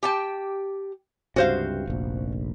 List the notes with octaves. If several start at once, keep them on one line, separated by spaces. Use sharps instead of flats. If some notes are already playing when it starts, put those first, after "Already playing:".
G4 G5 A5
C#2 G2 C3 F#4 C5 F5
F1 A#1